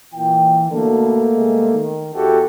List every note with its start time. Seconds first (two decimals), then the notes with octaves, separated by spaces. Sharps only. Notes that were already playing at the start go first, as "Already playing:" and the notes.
0.14 A#2 E3 G5
0.69 B2 D3 A3 A#3
1.33 C3 G3 G#3
1.73 D#3
2.15 E2 F#4 G4 A4